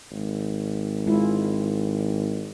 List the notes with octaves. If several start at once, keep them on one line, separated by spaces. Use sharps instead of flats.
G#1
G#3 E4 F4